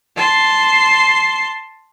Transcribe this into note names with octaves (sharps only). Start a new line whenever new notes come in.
A5 C6